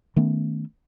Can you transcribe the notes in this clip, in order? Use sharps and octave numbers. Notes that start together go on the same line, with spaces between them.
D#3 A3 B3 C#4